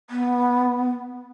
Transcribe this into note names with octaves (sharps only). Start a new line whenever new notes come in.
B3